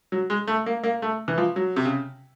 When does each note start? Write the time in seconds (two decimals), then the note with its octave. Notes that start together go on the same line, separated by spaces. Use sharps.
0.12 F#3
0.30 G#3
0.48 A3
0.66 A#3
0.84 A#3
1.02 A3
1.28 E3
1.38 F3
1.56 F#3
1.76 C3
1.85 C#3